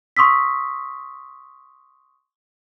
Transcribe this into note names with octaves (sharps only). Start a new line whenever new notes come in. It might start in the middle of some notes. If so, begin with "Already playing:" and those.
C6 C#6 D#6 E6 B6